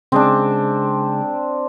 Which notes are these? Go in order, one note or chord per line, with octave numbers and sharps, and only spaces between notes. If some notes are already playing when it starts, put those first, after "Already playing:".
C#3 G#3 C4 D4 G#4